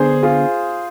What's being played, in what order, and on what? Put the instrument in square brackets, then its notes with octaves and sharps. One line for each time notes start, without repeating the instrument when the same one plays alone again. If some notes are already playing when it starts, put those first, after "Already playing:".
Already playing: [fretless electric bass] D3 B3 D4 [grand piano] G#4 C5
[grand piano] F4 G#4